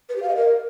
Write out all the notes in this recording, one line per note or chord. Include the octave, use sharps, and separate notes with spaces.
B4
G4
F5
D#5
A#4